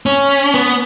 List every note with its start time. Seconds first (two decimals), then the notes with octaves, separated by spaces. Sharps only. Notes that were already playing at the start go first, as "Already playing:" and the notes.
0.06 C#4
0.54 B3